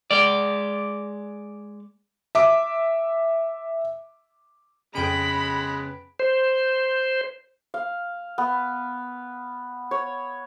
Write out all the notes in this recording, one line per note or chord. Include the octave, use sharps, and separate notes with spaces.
G#3 D5
E5 D6
F2 C#3 G#3 B3 G5 B5 D7
C5
F5
B3
C#5